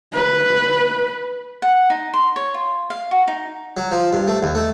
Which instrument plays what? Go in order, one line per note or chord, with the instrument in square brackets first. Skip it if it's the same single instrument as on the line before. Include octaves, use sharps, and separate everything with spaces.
[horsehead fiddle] B4
[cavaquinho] F#5
D#4
C6
C#5
F4
F5
F#4
D#4
[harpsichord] F#3
F3
G2
A3
D#2
A3